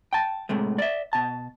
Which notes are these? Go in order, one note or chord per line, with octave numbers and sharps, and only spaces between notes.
G5 A5
A2 C3 G#3 A3
D5 E5
B2 A5